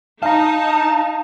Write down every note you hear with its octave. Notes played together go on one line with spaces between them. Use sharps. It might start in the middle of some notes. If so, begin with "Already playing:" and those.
D#4 F5 A5 A#5